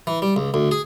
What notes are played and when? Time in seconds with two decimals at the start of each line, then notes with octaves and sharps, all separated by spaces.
0.07 E3
0.22 G3
0.36 C#2
0.54 D2
0.71 G#4